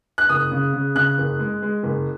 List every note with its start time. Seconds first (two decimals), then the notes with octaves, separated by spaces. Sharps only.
0.18 F#6
0.29 F#1 D#6
0.51 C#3
0.73 C#3
0.95 C#3 F#6
1.18 F#1
1.39 G#3
1.62 G#3
1.83 F#1